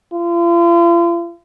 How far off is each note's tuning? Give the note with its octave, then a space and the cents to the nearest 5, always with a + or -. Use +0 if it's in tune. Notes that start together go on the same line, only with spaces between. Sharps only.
F4 -40